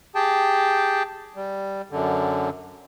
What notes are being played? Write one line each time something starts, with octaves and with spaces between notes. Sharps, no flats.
G4 G#4 G5 A5
G3
F#2 D3